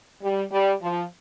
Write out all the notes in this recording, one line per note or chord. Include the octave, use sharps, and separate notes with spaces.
G3
G3
F3